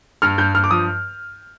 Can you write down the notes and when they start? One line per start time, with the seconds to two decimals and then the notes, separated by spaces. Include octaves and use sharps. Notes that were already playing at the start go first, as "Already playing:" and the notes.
0.22 G2 F6
0.38 G2 G6
0.54 G2 F6
0.64 D6
0.71 F3 D#6